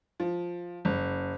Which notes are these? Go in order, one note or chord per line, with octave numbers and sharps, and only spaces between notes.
F3
F#1